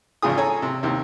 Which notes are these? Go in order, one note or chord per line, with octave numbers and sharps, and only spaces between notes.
G#1 E2 C#3 F4 G#4 D#6
G#4 A4 C#5 G#5 A#5
C3
D#2 C3